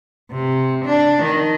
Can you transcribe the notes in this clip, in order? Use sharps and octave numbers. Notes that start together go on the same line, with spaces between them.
C3
D4
D#3